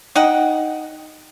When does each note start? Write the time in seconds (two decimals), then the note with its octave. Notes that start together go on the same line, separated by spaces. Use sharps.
0.16 D#4 F#5 G5